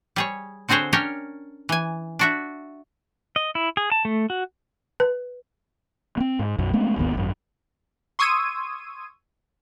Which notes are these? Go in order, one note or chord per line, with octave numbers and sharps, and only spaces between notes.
G3 G#4 C#5
D3 C4 F#4 G#4 C5 C#5
C#4 D4 A#4 C#5 G5
E3 G#5
D4 F#4 E5
D#5
E4
G#4
A5
A3
F#4
B4
B3 C4
G#2
B1 F#2 F#3
G#3 A3 B3 C#4
D1 G#1 D#2 B3
G#1 F#2
C6 C#6 D#6 E6 G#6 D#7